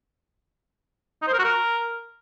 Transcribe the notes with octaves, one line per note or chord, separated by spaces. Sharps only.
D#4
C5
A#4
F#4
A#4